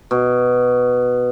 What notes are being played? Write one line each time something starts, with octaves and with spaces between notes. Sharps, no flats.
B2